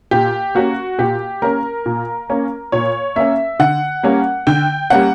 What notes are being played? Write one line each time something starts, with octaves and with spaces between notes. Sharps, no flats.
A#2 G4
A#3 C#4 F#4
A#2 G4
A#3 C#4 A#4
A#2
A#3 C#4
A#2 C#5
A#3 C#4 E5
D3 F#5
G3 A#3 C#4
D3 G5
G3 A#3 C#4 F#5